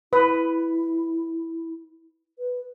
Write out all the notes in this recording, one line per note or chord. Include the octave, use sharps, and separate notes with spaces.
E4 B4
B4